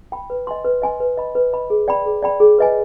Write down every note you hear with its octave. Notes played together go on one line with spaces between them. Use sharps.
G5 B5
B4
D#5 G#5 C6
B4
D#5 G#5 C6
B4
D#5 B5
B4
D#5 B5
G#4
D5 G5 B5
G#4
D5 G5 B5
G#4
B4 D#5 G#5